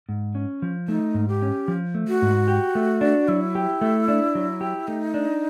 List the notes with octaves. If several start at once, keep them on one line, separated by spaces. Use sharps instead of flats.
G#2
C#4
F3
A3 D#4
G#2
G4
C#4
F3
A3
F#4
G#2
G4
A3
D4
F#3 E4
G4
A3
D4
F#3
G4
A3 D#4
D4